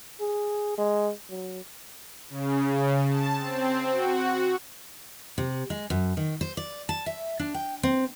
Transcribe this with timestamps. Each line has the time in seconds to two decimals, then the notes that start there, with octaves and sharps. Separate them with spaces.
0.20 G#4
0.78 G#3
1.30 F#3
2.30 C#3
3.08 A5
3.38 C4
3.91 F#4
5.38 C3
5.70 G#3
5.90 F#2
6.17 D#3
6.41 C5
6.57 D5
6.89 A5
7.06 E5
7.39 D4
7.54 G5
7.83 C4